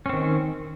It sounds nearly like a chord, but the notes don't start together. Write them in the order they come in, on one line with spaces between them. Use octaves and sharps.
C#4 C4 D#3